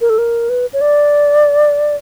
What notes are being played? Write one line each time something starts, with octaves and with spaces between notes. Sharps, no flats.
A#4
A4
A#4
B4
C#5
D5